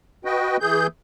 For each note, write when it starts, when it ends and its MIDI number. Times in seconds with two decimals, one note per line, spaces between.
0.25 0.57 66
0.25 0.57 71
0.25 0.57 75
0.25 0.57 79
0.60 0.87 52
0.60 0.87 68
0.60 0.87 91